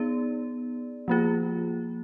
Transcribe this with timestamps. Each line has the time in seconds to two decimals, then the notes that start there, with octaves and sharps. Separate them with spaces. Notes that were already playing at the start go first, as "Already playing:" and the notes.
Already playing: B3 D#4 G#4 D5
1.08 F3 A#3 F4 G#4